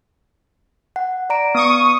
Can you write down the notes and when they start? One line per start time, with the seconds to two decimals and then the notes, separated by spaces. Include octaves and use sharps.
0.96 F#5
1.30 D5 A#5 D7
1.55 B3 C#6 D#6